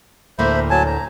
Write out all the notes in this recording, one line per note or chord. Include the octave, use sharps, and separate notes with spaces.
D2 A2 A#3 C5 E5 B5
F#3 G#5 A5
A#5